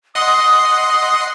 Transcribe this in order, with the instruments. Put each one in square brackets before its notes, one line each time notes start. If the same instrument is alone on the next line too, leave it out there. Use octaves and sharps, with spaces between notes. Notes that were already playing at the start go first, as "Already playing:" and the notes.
[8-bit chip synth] D#5 F#5 C6 [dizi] D#6